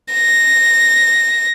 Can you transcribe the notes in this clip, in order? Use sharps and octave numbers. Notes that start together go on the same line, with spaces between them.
A#6